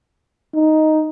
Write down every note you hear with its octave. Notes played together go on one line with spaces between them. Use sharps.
D#4